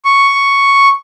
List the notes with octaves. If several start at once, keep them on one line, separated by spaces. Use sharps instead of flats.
C#6